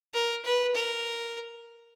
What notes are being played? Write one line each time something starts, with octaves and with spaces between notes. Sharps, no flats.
A#4
B4
A#4